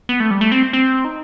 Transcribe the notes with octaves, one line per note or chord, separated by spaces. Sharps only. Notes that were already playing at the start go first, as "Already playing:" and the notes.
B3
A3
G3
A3
C4
C4
D#4